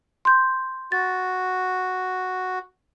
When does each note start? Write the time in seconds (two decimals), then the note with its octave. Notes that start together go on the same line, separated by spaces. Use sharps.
0.25 C6 G6
0.92 F#4 A6